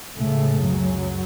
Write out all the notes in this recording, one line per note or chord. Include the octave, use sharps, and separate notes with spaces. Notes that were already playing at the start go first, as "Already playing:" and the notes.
C#2 A2 C#3 A3
F#2 F#3